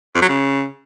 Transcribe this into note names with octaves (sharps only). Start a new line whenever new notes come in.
F2
F#3
C#3